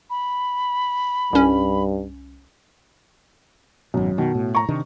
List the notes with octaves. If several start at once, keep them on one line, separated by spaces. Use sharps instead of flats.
B5
C2 G2 C#4
G#1 F#2 B2
B2 D#3
A2
A#5 C#6
C3 D#3 D4